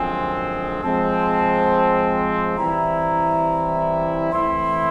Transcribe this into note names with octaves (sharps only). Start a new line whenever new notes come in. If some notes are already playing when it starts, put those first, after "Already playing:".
Already playing: F#2 D3 F3 G#3 C4 G#5
F3 G#3 C4 A5
E3 G3 C4 E4 A#5
E3 A3 C4 E4 C6